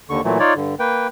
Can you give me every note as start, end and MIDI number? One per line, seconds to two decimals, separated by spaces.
0.10 0.21 39
0.10 0.21 50
0.10 0.21 85
0.24 0.38 46
0.24 0.38 52
0.24 0.38 54
0.24 0.38 57
0.40 0.54 63
0.40 0.54 65
0.40 0.54 73
0.40 0.54 74
0.56 0.75 43
0.56 0.75 50
0.79 1.08 58
0.79 1.08 71
0.79 1.08 79